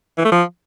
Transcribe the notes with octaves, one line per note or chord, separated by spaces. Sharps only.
E3
A3
F3